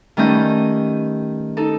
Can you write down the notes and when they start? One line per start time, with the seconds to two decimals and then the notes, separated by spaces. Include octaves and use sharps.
0.17 D#3 G3 A3 C#4 D#5 G6
1.57 D#4 A4